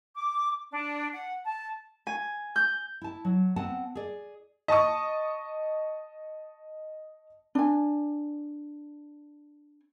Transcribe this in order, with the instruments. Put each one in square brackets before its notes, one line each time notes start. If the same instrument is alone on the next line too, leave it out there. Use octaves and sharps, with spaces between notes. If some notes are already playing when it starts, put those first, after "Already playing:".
[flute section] D6
D4
F#5
A5
[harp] G#5
G6
[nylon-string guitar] E4 A5
F#3
B3 C4 F#5 A5
G#4 D5
[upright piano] D#5 A5 C#6 D#6
[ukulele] D4 G#5